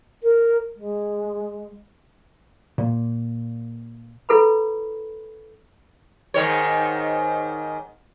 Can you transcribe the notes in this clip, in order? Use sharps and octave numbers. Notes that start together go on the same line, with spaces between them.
A#4
G#3
A#2
E4 A4 B4 B5
G#2 D#3 C#5